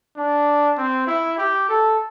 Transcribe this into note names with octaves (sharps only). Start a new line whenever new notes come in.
D4
C4
E4
G4
A4